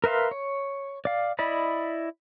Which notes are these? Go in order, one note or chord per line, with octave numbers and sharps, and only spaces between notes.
A#4 B4 E5 F5 C6
C#5
D5 F5
E4 D5 D#5 B5